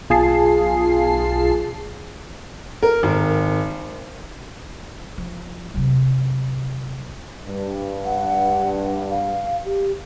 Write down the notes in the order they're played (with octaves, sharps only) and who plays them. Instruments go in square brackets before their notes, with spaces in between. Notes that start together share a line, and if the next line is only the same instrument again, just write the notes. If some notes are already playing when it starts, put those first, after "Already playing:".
[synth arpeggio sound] B1 F4 G#4 A5 C7
[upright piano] A#4
G#1
[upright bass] F3
C3 F#3
[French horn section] G2
[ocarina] F#5
F5
G4